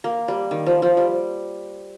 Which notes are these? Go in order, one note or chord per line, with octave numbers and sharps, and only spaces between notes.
A#3
G3
D#3
F3
F3
G3